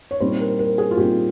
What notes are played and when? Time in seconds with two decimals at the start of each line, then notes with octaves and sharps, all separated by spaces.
0.11 C#5
0.20 A#2 G3 C4 D#4 C5
0.40 A#4
0.59 A#4
0.78 G#4
0.91 F4
0.97 A#2 G3 C4 D#4 G4